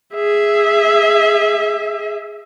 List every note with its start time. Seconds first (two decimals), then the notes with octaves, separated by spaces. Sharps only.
0.15 G#4 E5